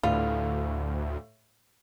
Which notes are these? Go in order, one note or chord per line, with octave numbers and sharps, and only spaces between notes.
D2 A2 G3 B3 F4